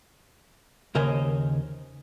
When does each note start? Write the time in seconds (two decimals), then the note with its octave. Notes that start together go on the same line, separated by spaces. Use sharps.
0.95 D#2 C#3 A#4 C5 D#5 G#5